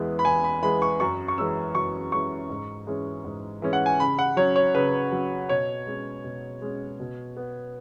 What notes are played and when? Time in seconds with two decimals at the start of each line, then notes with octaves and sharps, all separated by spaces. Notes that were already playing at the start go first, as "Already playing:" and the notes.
Already playing: E2 E3 G#3 B3
0.19 B5
0.25 E2 G#5
0.44 B5
0.62 E3 G#3 B3 B5
0.82 C#6
1.00 F#2 C#6
1.28 C#6
1.37 E3 G#3 C#4 E6
1.75 F#2 C#6
2.12 E3 G#3 C#4 C#6
2.50 G#2
2.87 E3 G#3 C#4
3.25 G#2
3.62 E3 G#3 C#4
3.73 F#5
3.86 G#5
3.99 C#3 B5
4.19 F#5
4.37 F#3 C#4 C#5
4.56 C#5
4.75 C#3 B4
5.12 F#3 C#4
5.49 B2 C#5
5.87 G#3 C#4
6.24 B2
6.62 G#3 C#4
7.00 B2
7.37 B3